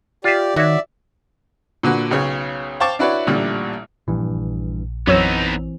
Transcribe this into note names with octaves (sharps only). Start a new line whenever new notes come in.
F4 G4 D5 E5
D#3 F#4 C#5 D5 E5
A#2 D3 F#4 B4
B1 C#3 C#5
C5 F5 G5 A5 C#6 D6
D4 E4 F#4 B4 C#5 D5
A1 A#2 D3 G3
A#1 G2 E3
F#2 E3 B3 C4 D#4 C#5 E6